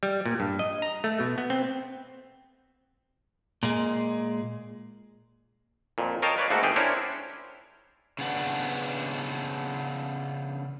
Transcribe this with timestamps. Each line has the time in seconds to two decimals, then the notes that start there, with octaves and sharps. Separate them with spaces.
0.03 G3
0.26 A#2
0.40 G2
0.59 D#5
0.82 A#5
1.04 A3
1.20 B2
1.38 B3
1.50 C4
3.63 A#2 G#3
5.98 F2 A#2
6.22 A#4 C#5 D#5 F5 G5 A5
6.38 B4 C#5 D5 F5
6.50 G#2 A3 A#3 F#4 A4
6.63 G1 G4 G#4 G5
6.76 C#4 D4 E4 A#4 C5 C#5
8.19 C#3 B3 D4